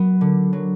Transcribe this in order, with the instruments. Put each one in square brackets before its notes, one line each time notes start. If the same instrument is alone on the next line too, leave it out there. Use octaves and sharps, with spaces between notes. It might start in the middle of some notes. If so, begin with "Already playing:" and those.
Already playing: [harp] F#3 B3
D3
F#3